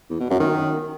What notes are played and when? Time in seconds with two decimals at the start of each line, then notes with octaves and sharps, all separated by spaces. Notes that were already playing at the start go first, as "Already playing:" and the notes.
0.10 E2
0.20 B2
0.30 F#2
0.40 D#3